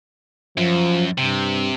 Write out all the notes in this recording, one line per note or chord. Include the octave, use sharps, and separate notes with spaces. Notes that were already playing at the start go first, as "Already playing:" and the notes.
F#2 F3
G2 C3